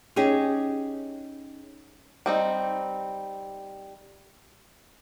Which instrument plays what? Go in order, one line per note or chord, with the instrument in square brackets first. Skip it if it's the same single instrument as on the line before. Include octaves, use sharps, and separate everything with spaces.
[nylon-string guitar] C#4 D#4 G4 G#4
[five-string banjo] G3 C4 D#4